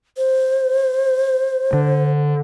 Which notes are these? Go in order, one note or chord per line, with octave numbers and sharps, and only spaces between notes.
C5
D3